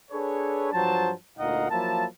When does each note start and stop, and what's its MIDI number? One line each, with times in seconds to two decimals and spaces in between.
0.11 0.69 62
0.11 0.69 68
0.11 0.69 69
0.11 0.69 71
0.11 0.69 73
0.73 1.12 43
0.73 1.12 53
0.73 1.12 54
0.73 1.12 72
0.73 1.12 81
1.38 1.69 38
1.38 1.69 46
1.38 1.69 63
1.38 1.69 75
1.38 1.69 77
1.38 1.69 78
1.70 2.05 53
1.70 2.05 54
1.70 2.05 58
1.70 2.05 64
1.70 2.05 81